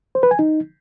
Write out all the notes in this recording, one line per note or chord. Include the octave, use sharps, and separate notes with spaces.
C5
B4
G#5
D#4